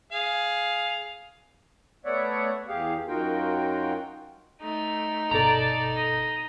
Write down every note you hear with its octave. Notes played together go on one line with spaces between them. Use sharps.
G#4 F5
A3 B3 C#5 D5 E5 F#5
E2 G4 G#4 F5
F#2 D#4 F4 F#4 A#4 G5
A3 D#4
G1 B2 A4 D5 A5 A#5
D#5